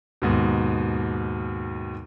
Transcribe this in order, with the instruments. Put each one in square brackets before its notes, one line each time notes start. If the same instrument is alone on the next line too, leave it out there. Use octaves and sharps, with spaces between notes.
[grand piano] D#2 G#2 B2